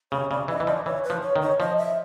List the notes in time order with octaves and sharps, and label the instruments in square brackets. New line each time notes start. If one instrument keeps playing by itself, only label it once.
[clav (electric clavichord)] C#3 [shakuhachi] C#5
[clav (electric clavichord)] C#3 [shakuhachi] D5
[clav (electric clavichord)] E3 [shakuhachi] D#5
[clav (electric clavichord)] E3
[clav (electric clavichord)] F3 [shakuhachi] D5
[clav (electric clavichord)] E3 [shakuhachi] C#5
[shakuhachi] B4
[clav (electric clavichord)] F3
[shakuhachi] C#5
[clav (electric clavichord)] D#3
[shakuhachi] C#5
[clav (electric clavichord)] F3 [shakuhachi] D#5
[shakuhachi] E5